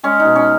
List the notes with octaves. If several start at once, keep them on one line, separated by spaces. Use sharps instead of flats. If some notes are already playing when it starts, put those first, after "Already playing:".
G#3 C#4
D#4
B2
C#4